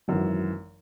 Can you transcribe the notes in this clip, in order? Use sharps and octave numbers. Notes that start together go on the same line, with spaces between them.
G#1 F#2 E3